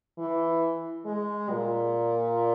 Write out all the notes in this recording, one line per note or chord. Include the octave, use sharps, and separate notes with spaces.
E3
G#3
A#2